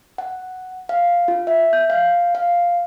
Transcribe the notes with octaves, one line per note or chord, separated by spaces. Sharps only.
F#5
F5
F4
E5
G6
F5
F5